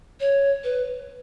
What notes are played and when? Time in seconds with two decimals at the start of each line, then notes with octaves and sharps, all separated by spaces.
0.20 C#5
0.64 B4